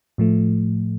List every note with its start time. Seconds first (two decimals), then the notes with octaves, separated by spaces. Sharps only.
0.18 A2 F3 A3